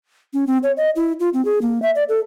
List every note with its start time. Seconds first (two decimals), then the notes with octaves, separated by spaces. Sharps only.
0.34 C#4
0.47 C4
0.63 C#5
0.77 D#5
0.96 E4
1.20 F4
1.34 C4
1.45 G#4
1.62 A#3
1.82 E5
1.95 D5
2.09 A4